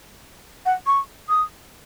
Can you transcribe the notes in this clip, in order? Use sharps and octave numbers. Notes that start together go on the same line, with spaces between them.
F#5
C#6
D#6